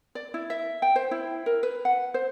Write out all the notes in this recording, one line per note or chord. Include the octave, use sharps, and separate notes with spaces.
D5
E4
E5
G5
C5
E4
A#4
B4
F#5
C5